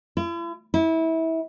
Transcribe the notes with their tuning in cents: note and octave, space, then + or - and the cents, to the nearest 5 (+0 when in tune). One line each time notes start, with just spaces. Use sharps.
E4 +45
E4 -25